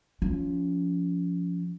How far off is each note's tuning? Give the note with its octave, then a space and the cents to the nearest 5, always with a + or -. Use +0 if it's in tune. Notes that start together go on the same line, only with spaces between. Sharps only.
F3 +0 C#4 +30